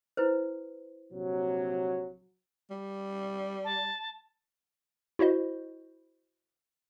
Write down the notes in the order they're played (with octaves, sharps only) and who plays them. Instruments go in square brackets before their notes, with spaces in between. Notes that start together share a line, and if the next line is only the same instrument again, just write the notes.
[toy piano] E4 B4 C5
[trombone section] A#1 C3 F#3
[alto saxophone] G3
[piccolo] A5
[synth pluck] E4 F#4 C5 D#5